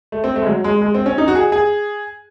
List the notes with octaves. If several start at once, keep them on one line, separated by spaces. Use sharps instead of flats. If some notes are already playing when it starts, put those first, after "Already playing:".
A3
C4
A3
G#3
F#3
G#3
G#3
C4
C#4
D#4
F#4
G#4
G#4